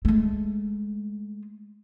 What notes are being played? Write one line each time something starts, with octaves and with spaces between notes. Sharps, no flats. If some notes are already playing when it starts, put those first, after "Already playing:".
G#3 A3